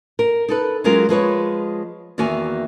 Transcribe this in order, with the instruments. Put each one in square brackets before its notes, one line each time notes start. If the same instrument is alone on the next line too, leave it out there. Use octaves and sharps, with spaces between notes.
[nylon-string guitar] A#4
D#4 A4 B4
F#3 G#3 C#4 F4 A#4
F3 G#3 B4 C#5
E2 D#3 A#3 F#4 E5 G#5